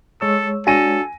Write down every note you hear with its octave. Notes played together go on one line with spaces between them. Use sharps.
G#3 A4 C#5 E6
D4 F#4 A4 G#5 A#6 D#7